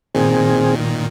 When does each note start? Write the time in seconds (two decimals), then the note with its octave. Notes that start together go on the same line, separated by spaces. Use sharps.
0.15 A#2 D#3 C4 G#4